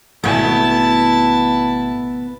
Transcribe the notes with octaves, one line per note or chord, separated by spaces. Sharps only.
G#1 B2 A3 B3 E4 A5